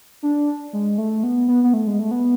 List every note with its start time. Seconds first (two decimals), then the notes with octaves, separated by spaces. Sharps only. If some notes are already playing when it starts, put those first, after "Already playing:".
0.23 D4
0.73 G#3
0.98 A3
1.23 B3
1.48 B3
1.64 B3
1.74 A3
1.87 G#3
1.99 A3
2.11 B3